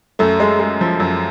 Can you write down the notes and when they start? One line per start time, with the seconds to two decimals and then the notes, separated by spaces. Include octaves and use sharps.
0.19 F#2 A3
0.40 G#3
0.60 G#3
0.81 F3
1.00 F#2